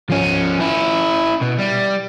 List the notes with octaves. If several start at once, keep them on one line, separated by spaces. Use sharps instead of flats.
F3 C#4
C#4 E4
B2
G3